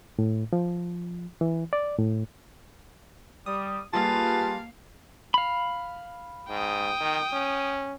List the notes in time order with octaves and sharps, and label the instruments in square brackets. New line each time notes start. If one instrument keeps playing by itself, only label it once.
[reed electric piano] A2
F3
E3
D5
A2
[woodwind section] G3 [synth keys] D#6
[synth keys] G3 F4 [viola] A#3 F5 [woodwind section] G4 G#4 B4 [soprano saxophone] A5
[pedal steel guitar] F5 B5
[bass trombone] G#2 [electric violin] G5 D#6
[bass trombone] D#3
C#4